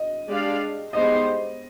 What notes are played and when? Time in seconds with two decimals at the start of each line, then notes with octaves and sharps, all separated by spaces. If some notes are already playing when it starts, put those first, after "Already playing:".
Already playing: D#5
0.28 G#3 D4 G4 D5 F5
0.93 G#3 B3 D#4 G4 C5 D#5